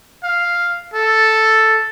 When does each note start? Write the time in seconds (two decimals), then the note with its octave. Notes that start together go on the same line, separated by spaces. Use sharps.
0.24 F5
0.94 A4